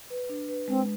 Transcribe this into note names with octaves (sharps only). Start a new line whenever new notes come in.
B4
D4
B4
G#3 C4